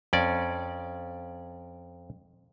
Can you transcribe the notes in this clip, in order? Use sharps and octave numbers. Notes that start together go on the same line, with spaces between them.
F2 C#4 D5